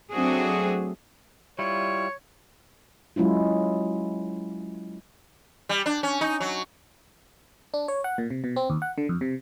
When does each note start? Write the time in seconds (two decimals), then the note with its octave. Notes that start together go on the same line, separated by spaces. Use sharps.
0.12 F#3 A3 C4 D4 F#4 G#4
1.59 G3 E4 F4 C#5
3.16 F#3 G#3 C#4 E4 F4
5.69 G3
5.86 D4
6.03 C#4
6.21 D#4
6.40 F#3
7.74 D4
7.88 C#5
8.04 F#5
8.18 A#2
8.30 C3
8.44 B2
8.56 C4
8.70 D#2
8.82 F#5
8.98 D3
9.09 F2
9.21 C3